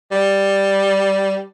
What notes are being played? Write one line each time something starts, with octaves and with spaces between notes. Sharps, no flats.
G3